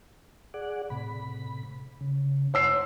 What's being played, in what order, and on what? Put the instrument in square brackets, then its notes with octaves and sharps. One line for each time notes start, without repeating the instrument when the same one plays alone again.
[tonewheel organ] G#4 D5 F#5
A2 C3 B5
C#3
[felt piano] C#5 E6 C7 [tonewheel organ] F#5 C6